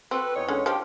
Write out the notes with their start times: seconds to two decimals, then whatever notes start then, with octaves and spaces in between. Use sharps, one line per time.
0.11 C4 F#4 A4 B4
0.35 E2 D#4 C#5
0.48 D3 G#3 C#4
0.66 F3 G4